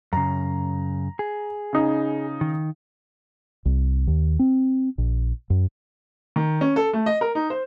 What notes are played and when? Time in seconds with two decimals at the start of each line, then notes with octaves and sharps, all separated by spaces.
0.13 F#2 C#3 A#5
1.19 G#4
1.73 C#3 D#4
2.41 D#3
3.65 C2
4.07 D#2
4.39 C4
4.98 A#1
5.50 F#2
6.36 D#3
6.61 C#4
6.76 A4
6.93 A3
7.06 D#5
7.21 A#4
7.35 D#4
7.50 C5